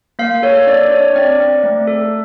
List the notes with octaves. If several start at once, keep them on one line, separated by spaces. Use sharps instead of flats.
A#3 F5
A4 C#5
D4 D5
D4 C#5
C4 D5
C4
A3
A4